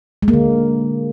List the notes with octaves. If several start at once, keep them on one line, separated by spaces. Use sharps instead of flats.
G#3
A#3
D3